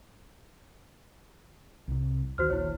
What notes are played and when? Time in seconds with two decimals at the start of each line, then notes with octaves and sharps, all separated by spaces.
1.88 C2 C3
2.38 D#2 D#3 F#4 C5 F6
2.50 D#1 A#1 E4 C#5